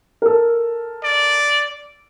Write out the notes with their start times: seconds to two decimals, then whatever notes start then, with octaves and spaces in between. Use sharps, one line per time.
0.22 A4 A#4
1.04 D5